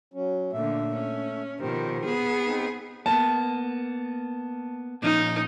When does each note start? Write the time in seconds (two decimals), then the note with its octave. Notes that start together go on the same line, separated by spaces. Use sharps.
0.14 F#3 C#4
0.53 A#2 D3 A3 E5
0.95 C#4
1.60 B2 D#3 F3 G4 C5
2.05 B3 G#4
2.45 C4 D#4
3.06 A#3 B3 A5
5.02 A#2 F3 C#4 D#4